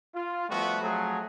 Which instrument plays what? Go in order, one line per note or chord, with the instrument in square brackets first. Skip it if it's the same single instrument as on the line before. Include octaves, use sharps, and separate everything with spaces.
[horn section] F4
F3 G3 A3 B3 F#4
F3 F#3 A3 C4 G#4